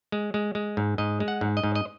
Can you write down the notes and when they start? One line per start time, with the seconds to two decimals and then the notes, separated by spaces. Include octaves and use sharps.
0.12 G#3
0.34 G#3
0.55 G#3
0.77 G#2
0.98 G#2 D#5
1.20 G#3
1.28 F#5
1.41 G#2
1.57 D#5
1.64 G#2
1.75 D#5